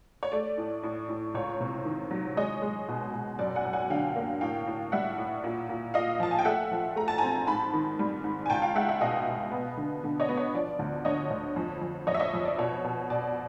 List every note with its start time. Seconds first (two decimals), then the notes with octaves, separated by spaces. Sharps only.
0.23 C#5
0.32 A3 D5
0.58 A2
0.83 A2
1.09 A2
1.34 C#2 C#5
1.61 C3
1.85 D#3
2.11 F#3
2.37 G#3 C#5 D#5
2.62 G#3
2.88 B2
3.14 B2
3.39 F#2 D5
3.55 F#5 G#5
3.65 F#2
3.73 F#5 G#5
3.90 D3 F5 G5
4.16 A#3
4.41 A2 F5 G5
4.67 A2
4.92 G3 E5 F#5
5.18 A2
5.44 A#2
5.69 A#2
5.94 A#2 D#5 F5
6.20 F3 A5
6.31 G#5
6.39 G5
6.45 A3 E5 F#5
6.72 F3
6.96 A3 A#5
7.08 A5
7.18 C4 G#5 A#5
7.47 G#2 A5 B5
7.74 D#3
7.99 G3
8.24 G#2
8.46 G#5
8.50 C#2 G5 A5
8.62 F5 G5
8.75 G#3 E5 F#5
8.88 E5 F#5
9.01 B2 D#5 F5
9.27 B2
9.51 B3
9.77 D3
10.04 D3
10.20 C#5 D#5
10.29 B3
10.37 C#5
10.54 F3 D5
10.79 D2
11.05 D3 C#5 D#5
11.30 D2
11.56 F2
11.82 F2
12.07 F2 C#5 D#5
12.14 E5
12.20 C#5 D#5
12.34 F2
12.45 D5
12.58 B2 C#5
12.84 B2
13.10 B2 D5